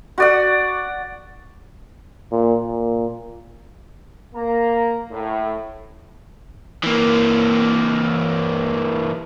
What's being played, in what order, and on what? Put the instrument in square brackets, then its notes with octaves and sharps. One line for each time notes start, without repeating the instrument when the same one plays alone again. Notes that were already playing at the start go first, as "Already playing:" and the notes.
[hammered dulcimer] F#4 D5 F#5
[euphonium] A#2
A#2
[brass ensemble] A#3 A#5
A2
[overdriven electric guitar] E3 A#3